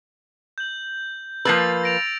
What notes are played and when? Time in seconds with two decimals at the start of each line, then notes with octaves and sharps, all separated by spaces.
0.58 G6 F#7
1.45 F3 A#3 B4 E6 A6 F7
1.83 A#6 D7 F7